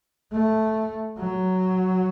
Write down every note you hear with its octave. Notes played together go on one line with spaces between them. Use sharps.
A3
F#3